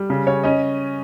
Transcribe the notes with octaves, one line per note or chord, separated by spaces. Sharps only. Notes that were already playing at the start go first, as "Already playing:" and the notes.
Already playing: G3
C#3
C#3 C#5
C#4 D#5